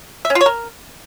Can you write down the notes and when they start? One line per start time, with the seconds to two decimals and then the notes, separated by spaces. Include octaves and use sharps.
0.25 E5
0.30 C#4
0.35 F4
0.41 C#5
0.46 A#4